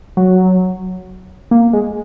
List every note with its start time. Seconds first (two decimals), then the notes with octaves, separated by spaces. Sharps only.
0.17 F#3
1.51 A#3
1.73 G#3